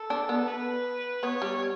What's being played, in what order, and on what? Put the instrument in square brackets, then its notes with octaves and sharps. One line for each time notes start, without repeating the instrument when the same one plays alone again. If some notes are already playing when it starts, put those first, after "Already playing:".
Already playing: [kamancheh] A4
[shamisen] D4
B3
[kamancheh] B4
[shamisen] B3 [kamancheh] C#5
[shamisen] G3